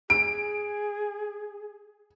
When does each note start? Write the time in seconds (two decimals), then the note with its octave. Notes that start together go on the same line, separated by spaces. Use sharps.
0.10 G#4 D7